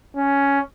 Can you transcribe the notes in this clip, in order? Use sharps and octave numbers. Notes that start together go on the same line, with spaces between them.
C#4